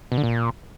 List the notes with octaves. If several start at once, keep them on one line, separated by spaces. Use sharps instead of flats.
B2
D3
A#2